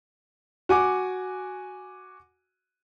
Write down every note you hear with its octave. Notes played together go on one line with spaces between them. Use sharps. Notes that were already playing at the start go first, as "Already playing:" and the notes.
F#4 G#5 D6